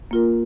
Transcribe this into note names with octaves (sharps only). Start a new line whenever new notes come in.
A#3 F4 A#4